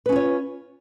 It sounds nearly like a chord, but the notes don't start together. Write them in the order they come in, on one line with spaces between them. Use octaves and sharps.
B4 C#4 F4 C#5